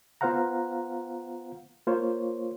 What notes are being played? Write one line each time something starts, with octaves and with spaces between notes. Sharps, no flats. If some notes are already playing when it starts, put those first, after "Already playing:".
B3 F4 C5 F5 F#5 A#5
A#3 F4 C5 C#5